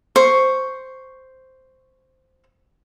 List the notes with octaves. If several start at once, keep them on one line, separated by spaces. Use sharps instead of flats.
C5 C#6